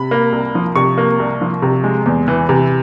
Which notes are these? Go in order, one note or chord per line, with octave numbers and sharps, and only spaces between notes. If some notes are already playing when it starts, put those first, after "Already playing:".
Already playing: C3 B5
A#3
C2
F3
C3 C#6
A#3
C2
F3
C3
G#3
E2
E3
C3